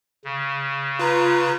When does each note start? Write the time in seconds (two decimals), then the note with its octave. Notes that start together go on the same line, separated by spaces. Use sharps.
0.25 C#3
0.99 F4 B4 A#5